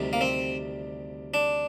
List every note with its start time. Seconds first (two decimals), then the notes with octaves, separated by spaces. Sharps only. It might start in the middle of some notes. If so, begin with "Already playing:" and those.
Already playing: D2 C3 D#3 G3
0.13 A#3
0.21 C4
1.34 D4